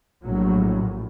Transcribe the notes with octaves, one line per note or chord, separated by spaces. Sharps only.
A#1 A2 F#3